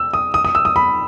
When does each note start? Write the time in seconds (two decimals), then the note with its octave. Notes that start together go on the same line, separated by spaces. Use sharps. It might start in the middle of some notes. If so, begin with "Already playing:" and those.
Already playing: E6
0.14 D#6
0.34 D#6
0.45 D#6
0.55 E6
0.65 D#6
0.76 B5